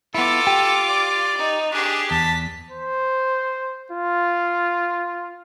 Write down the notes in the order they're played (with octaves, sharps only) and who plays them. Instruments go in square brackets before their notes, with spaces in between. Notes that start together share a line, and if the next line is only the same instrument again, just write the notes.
[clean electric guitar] B3 E4 [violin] F4 D6 [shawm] A4
[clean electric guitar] G4
[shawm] D5
[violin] D#4
[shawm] D4 [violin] G4 G#4
[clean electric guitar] E2 [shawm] A5 [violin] B6
[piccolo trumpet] C5
F4